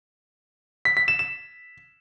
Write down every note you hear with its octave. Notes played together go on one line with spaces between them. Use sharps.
B6
B6
E7
E7